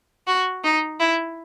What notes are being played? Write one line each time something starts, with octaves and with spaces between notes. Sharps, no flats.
F#4
D#4
E4